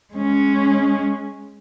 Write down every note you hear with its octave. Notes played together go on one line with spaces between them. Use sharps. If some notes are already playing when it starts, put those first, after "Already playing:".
G#3 C#4